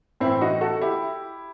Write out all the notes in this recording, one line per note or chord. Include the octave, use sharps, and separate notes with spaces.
A2 E3 C4 E4
D#4 F#4
F#4 A4
E4 G4